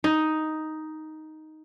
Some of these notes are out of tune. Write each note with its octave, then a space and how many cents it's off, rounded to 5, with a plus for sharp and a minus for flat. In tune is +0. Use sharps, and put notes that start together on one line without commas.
D#4 +5